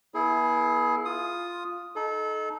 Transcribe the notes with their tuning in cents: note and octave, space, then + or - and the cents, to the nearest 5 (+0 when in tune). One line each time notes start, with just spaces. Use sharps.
B3 -35 E4 -10 G#4 +25
F4 +0 D#6 +0
D#4 +0 A4 -30